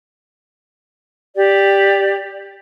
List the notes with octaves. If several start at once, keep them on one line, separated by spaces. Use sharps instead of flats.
G4 D5